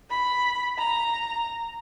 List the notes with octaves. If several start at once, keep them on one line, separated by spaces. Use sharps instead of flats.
B5
A#5